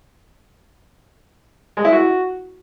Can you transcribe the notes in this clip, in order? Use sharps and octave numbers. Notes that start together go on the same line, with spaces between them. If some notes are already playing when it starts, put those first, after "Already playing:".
G#3
E4
F#4